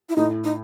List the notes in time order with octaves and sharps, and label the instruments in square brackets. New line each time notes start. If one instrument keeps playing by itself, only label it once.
[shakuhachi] E4
[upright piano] A2 [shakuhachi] D#4
[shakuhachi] D#4